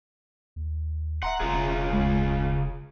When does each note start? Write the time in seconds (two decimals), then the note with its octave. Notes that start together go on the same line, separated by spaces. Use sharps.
0.56 D#2
1.23 D1 E5 F#5 A#5 C6
1.40 E1 C#3 F4 G#4
1.93 D2 G#3